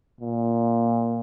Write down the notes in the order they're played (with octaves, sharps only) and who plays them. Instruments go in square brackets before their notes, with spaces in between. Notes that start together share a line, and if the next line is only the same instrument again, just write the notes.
[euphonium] A#2